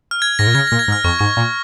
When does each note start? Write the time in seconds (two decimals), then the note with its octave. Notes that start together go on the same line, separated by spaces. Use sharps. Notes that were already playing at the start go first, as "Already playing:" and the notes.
0.11 F6
0.22 G#6
0.39 G#2 A#6
0.47 A#2
0.55 C#3 G#6
0.67 A#2 A#6
0.79 G#6
0.88 G#2
0.92 F6
1.04 F2 C#6
1.19 G#2 C#6
1.37 A#2